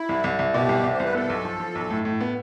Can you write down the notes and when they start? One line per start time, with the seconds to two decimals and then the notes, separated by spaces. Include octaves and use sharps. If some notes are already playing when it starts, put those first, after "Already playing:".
Already playing: E4
0.09 C2
0.24 C2
0.39 C2
0.54 B2 G4
0.69 C2
0.84 C2
0.93 C5
1.00 C2 B4
1.14 B3 A4
1.30 B1
1.45 F3
1.60 F3
1.75 B1
1.90 A2
2.05 A2
2.21 B3